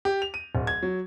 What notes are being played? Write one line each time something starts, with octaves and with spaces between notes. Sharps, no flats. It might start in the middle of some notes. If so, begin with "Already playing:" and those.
G4
F7
D#7
D1
G#6
F#3